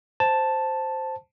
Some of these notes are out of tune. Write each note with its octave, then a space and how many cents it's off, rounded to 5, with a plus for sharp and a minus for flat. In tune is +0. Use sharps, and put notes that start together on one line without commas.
C5 +0 A5 +0